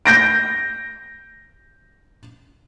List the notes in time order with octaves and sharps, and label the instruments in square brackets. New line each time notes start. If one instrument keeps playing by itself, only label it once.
[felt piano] G6 A#6 D7